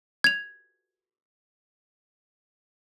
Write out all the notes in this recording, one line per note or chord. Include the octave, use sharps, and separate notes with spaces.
G#6 F7